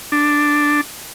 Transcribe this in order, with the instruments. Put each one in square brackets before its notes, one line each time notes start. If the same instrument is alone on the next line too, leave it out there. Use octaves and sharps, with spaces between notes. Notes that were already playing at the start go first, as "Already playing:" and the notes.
[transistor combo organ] D4